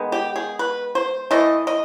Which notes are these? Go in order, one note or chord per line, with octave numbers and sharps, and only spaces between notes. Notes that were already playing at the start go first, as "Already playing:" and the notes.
Already playing: D#3 G#3 B3
G4
G#4
B4
C5
E3 A3 D#5
D#5